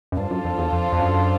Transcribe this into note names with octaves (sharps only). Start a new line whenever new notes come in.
F#2
G2 D4 F4 A4 C5
F#2
F2
E2
F2
F2
F#2